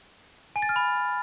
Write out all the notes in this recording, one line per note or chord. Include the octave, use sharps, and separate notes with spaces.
G#5
A6
F6
B5